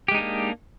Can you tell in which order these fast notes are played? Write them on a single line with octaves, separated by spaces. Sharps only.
G4 G#3 D#4 D4 A#3